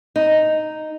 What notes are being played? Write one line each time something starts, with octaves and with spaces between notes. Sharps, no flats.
D#4